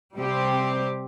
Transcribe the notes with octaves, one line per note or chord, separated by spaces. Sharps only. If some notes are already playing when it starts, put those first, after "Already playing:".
C3 G3 C4 G4